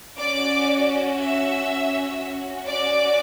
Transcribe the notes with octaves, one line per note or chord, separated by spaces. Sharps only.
C#4 F#4 D5 D6
E5 E6
C#4 F#4
D5 D6